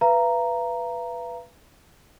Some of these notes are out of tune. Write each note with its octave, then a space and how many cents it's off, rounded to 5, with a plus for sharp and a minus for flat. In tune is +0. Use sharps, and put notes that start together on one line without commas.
B4 +0 F5 -45 A#5 +0